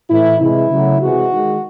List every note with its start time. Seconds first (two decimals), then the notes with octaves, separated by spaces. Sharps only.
0.10 A2 E3 A3 E4
0.40 C3 E3 G#3 E4
0.71 C#3 F#3 A3
1.01 C3 E3 G#3 F#4
1.32 D#3 G#3